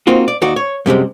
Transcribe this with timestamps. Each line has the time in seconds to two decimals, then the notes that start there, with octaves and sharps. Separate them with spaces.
0.07 A#3 C4 D#4 F4 F#4
0.28 D5
0.42 D#2 D#4 F#4 D5
0.56 C#5
0.86 F#2 C3 G3 G#3